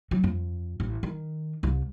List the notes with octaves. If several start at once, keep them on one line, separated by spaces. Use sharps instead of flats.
F#3
F2
A1
D#3
C2